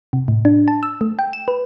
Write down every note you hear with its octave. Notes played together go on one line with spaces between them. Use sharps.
C3
A2
D4
A5
E6
A3
G5
E7
B4